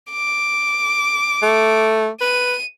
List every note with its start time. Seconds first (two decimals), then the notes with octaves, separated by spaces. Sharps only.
0.11 D6
1.43 A3
2.21 B4 D#7